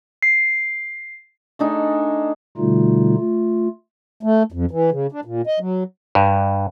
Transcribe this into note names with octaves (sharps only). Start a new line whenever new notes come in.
C7
A3 D4 D#4 G#4
B2 D3 G3 A3 D#4 F4
A3 F4
A3
F2
E3
C#3
D4
A#2
D#5
F#3
G2